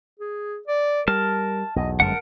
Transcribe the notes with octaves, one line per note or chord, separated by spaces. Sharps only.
G#4
D5
G3 A#4 A5 F6
B1 E2 D#5
G1 F#2 G#3 A#4 F#5 A5